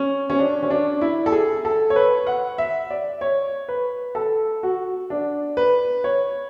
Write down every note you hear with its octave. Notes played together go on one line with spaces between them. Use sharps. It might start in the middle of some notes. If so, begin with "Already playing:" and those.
Already playing: C#4
C#4
D4
C#4
D4
E4
A4
G#4
A4
C#5
B4
F#5
E5
D5
C#5
B4
A4
F#4
D4
B4
C#5